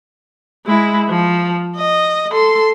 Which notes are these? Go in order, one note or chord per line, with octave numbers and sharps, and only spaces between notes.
G#3 E4
F3
D#5
A4 C6